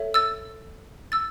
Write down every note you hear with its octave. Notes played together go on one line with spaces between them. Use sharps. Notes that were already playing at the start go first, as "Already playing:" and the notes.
Already playing: A4 C#5 E5
E6 A6
E6 A6